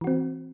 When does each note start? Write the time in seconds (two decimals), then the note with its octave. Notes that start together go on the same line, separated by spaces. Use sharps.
0.01 E3
0.04 F#4
0.07 C4